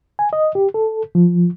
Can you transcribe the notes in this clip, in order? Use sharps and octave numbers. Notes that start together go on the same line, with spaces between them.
G#5
D#5
G4
A4
F3